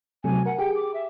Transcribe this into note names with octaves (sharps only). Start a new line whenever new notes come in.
C3 F#3 A3 G#5
A#4 F#5
G4 G#4 G5
D6
E5